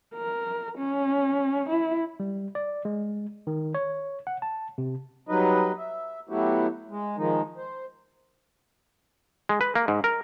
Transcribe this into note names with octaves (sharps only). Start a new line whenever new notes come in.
A#4
C#4
E4
G3
D5
G#3
D#3
C#5
F#5
A5
C3
F#3 G3 D#4 B4 D#5
E5
F#3 A3 B3 E4 F#4 G4
G#3
D#3 F3 G#3 D#4
C5
G#3
B4
A#3
G#2
A#4